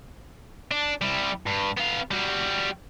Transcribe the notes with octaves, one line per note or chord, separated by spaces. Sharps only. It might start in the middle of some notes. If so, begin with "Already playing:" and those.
D4
G3 E4
G2
B3 F5
G3 F#4